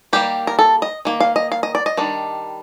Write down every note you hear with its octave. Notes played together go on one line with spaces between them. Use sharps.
D#3 G3 A#3 G4
A#4
A4
D#5
D#3 A#3
F5
D#5
F5
D#5
D5
D#5
D#3 G3 D4